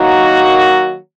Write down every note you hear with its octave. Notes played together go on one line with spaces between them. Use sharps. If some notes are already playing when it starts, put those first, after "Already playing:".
Already playing: D#3 F#3 A#3 D#4 F#4